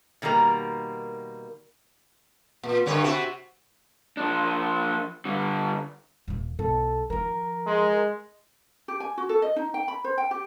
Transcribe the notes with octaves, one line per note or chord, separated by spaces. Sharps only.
B2 D#3 G3 A#3 A#4
A#2
G2 D3 C#5
C3 F#4
F3 D4
D3 G3
D#1 D#2
B1 A4
D#3 F3 A#4
G#3
G4
G#5
F#4
A4
D#5
D#4
G5
B5
C5
G5
G4